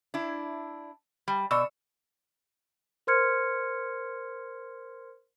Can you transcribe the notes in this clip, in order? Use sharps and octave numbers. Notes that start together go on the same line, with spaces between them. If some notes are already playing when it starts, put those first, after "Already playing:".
D4 E4
G3
B2 D5 C#6 E6
A#4 C5 C6 F6 G#6 C#7